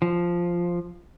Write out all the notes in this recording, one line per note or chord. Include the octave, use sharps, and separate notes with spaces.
F3